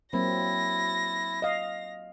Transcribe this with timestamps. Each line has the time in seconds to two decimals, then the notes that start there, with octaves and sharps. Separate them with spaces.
0.13 F#3 A#3 C4 E4 A#6
1.42 D#5 F5